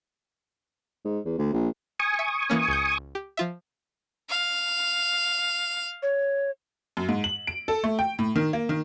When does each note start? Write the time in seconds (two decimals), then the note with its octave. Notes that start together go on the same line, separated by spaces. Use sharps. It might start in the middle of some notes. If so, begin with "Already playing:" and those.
1.05 G#2
1.25 E2
1.39 D2
1.53 A#1
1.99 G#5 C#6 D#6
2.19 E5
2.50 E3 A#3 C#4
2.68 C#2 G6
3.15 G4
3.37 F3 F4 E5
4.30 F5
6.02 C#5
6.97 F#2
7.09 G#2
7.24 F#7
7.47 D7
7.68 A4
7.84 A3
7.99 G5
8.19 A2
8.36 D#3
8.53 A#3
8.69 D#3